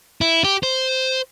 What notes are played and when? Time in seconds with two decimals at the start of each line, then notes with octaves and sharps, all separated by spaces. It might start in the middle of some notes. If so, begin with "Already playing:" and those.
0.21 E4
0.44 G4
0.63 C5